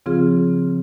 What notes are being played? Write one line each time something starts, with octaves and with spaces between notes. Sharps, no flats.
C#3 F3 C4 F4 G#4